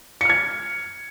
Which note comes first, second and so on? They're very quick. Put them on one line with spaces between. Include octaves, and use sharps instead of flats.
C#7 F6 G#6